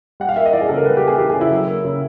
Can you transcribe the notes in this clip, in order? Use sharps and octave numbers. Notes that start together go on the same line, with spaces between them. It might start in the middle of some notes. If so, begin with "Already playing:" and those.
G3 F#5
F5
A#3 E5
D#5
E3 D5
G#4
C#3 A4
A#4
G3 B4
A#3 G4
G#4
E3 G4
G#4
C#3
E4
F#3
A#3
C#3